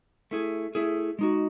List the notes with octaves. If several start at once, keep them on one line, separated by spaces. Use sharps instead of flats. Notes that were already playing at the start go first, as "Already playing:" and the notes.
A3 E4 G#4
A3 E4 G#4
G#3 D#4 F#4